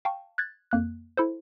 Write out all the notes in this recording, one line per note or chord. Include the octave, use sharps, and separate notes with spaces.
F5 G5 A5 C#6
F#6 G#6 A6
F2 A#3 F#6
E4 A4 C5